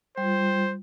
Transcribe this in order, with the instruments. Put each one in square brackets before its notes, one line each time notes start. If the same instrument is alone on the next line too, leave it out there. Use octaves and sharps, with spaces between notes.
[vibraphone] G3 F4 [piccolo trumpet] C5